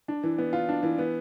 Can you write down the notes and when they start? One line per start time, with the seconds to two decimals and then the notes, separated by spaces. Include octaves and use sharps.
0.08 D4
0.23 E3
0.38 B3
0.53 F4
0.69 D4
0.83 E3
0.99 B3